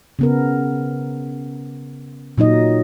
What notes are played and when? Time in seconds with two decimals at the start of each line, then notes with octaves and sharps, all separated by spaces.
0.19 C#3 B3 A#4
2.38 A#2 F#3 D#4 D#5